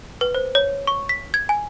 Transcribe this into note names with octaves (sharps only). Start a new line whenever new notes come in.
B4
C5
C#5
C#6
B6
G#6
G#5